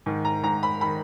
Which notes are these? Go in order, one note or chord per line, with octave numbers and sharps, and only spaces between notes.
G#2 D#3
A#5
G#2 D#3 A#5
B5
D#3 B5